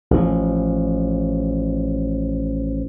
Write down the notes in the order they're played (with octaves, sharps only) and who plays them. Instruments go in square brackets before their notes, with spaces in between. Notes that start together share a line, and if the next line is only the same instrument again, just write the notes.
[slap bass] A1 F3